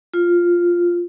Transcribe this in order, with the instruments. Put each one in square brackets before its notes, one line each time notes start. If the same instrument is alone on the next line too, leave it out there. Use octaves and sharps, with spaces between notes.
[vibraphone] F4